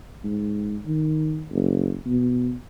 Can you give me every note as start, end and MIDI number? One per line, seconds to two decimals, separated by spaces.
0.24 0.76 44
0.86 1.44 51
1.50 1.95 30
2.06 2.54 47